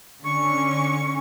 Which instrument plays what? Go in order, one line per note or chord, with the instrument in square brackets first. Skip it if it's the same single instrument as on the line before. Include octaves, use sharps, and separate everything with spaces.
[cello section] D3 C#4 [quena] C#6